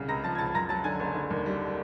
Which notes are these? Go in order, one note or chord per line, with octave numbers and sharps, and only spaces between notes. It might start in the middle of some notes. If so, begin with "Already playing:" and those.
Already playing: C2 C#3
C#2 A#5 A#6
F3 A5 A6
G#6
C#2 A5 A6
F#2 A#5 A#6
F#3 A5 A6
D3 G#5 G#6
F#1
D3
D#2
G3